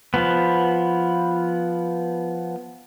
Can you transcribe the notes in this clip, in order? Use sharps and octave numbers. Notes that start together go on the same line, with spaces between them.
F3 B3